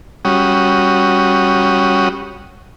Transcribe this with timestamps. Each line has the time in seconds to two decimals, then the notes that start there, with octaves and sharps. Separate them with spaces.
0.25 G3 C#4 F#4 D#6